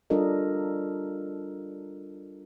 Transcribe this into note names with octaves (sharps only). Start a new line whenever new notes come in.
G3 D4 F4 A4 A#4 D#5